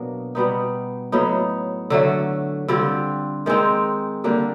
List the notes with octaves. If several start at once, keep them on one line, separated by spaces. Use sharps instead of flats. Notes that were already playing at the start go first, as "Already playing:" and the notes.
Already playing: B2 F#3 A#3 D4
B2 G3 B3 D#4
A2 F#3 B3 D#4
D3 F#3 A3
D3 G3 C4 F4
D#3 G#3 C4 D#4
D3 G3 A#3 D4